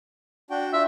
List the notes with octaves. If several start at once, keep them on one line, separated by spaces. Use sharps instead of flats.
D4 F#4 G5
D4 F4 E5